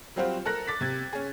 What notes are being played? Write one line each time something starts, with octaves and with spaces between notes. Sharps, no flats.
F#3 G3 C4 F4 F#4 C5
A4 A#4 F#6 A#6
D6 A6 B6
C3 G#6
C#4 G#4